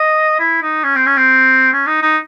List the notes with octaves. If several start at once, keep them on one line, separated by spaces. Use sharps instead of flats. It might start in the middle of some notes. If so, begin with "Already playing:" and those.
Already playing: D#5
E4
D#4
C#4
C4
C#4
C4
C#4
D#4
D#4